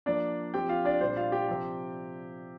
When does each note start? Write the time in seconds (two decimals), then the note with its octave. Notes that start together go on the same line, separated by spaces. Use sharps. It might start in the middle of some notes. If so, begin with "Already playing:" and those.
0.06 F3 A#3 D4 D5
0.54 F3 C4 G4 G5
0.69 F4 F5
0.85 D4 D5
1.01 A#2 G3 D4 C5
1.17 F4 F5
1.32 G4 G5
1.49 C3 F3 C4